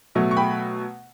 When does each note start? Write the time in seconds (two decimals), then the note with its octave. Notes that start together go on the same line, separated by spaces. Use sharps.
0.15 B2 F#3 A3
0.31 C#6
0.37 G5 B5